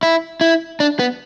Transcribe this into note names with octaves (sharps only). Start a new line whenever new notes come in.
E4
E4
D4
B3